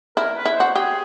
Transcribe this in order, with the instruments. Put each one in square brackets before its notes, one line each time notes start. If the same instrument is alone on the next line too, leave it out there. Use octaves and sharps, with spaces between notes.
[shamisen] E4 [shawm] A#4
[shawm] B4
[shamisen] E4
[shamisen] F#4 [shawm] C5
[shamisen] G4 [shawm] G#4